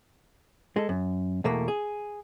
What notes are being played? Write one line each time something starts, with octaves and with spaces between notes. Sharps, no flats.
G#3 A4
F#2
E2 B2 A3 A#3
G#4